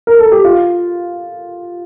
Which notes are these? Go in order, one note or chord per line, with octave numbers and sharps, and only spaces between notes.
A#4
A4
G4
F4